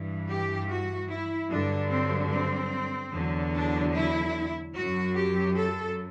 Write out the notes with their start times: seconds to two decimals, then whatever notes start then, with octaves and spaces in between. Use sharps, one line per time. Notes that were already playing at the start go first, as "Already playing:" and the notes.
Already playing: G2 E3
0.27 G4
0.68 F#4
1.09 E4
1.49 G2 D3 F#3 D4
1.90 C4
2.30 C4
3.12 E2 D3 F#3
3.53 D4
3.93 E4
4.74 F#2 F#3 F#4
5.15 G4
5.55 A4